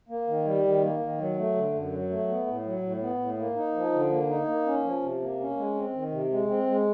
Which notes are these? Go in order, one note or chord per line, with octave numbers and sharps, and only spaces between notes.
A#3
D#3
G3
D#3
A#3
D#3
F#3
A3
D3
F#2
F#3
A3
B3
A2
F#3
A2
B3
A2
A#3
D#4
F3
D3
A#3
D#4
A#3
C#4
F3
C3
A#3
C#4
G#3
C4
D#3
C3
G#3
C4
G#3